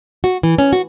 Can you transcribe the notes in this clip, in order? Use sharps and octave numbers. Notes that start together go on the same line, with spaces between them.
F#4
E3
C#4
F#4